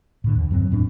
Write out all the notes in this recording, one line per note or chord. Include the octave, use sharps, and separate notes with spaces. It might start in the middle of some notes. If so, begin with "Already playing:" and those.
A2 D3
D#2
G2 F#3 A3 C4
E2 A2 C4 D4